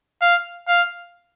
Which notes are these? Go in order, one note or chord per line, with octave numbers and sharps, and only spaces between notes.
F5
F5